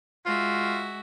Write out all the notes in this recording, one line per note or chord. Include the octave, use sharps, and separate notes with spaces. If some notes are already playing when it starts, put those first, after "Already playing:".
G#3 F4 F#4 E5